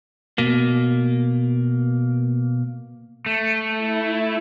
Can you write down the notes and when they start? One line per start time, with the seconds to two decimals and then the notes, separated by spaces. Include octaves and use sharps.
0.38 B2 A#3
3.26 A3
3.78 E4